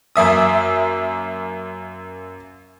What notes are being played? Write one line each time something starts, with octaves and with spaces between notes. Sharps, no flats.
F#2 A#3 E5 D#6